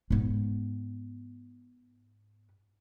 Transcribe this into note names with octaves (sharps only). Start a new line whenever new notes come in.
G#2 B3